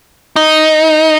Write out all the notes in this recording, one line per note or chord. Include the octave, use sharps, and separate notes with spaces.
D#4